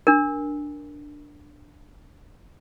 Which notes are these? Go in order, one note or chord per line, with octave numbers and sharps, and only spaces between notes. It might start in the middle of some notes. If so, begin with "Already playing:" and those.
D4 A#4